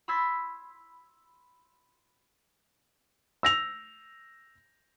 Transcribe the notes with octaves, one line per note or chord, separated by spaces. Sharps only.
B5 C6 E6 G#6 A6 B6
E6 A#6 F7